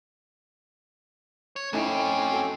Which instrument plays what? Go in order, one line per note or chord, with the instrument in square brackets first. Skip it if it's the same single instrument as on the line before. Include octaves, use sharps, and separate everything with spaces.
[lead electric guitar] C#5
[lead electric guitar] F2 C4 [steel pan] A3 D#4 E4 [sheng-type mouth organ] C#4 D6
[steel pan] F#4 A4